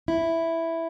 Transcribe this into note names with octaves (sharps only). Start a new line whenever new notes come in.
E4